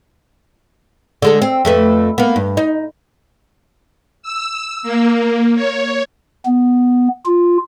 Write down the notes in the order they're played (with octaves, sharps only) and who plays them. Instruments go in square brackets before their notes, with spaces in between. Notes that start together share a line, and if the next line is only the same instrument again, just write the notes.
[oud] D3 G#3 A4
C4
F2 A3 B4
A#3 B3
G2
D#4
[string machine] E6
A#3
C#5
[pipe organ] B3
F4